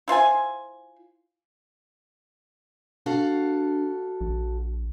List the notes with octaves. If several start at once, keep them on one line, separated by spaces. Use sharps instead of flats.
E4 F4 C5 G#5
D4 F#4 A4 F5
A#1